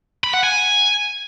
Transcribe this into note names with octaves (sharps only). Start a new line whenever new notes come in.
B5
F#5
G#5